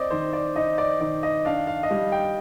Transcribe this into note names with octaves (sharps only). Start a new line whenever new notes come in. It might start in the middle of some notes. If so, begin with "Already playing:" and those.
Already playing: C4 D5 D#5
D#3 C5
D5
D#4 D#5
D5
D#3 D5
D#5
D4 F5
F5
D#5
G3 F5
G5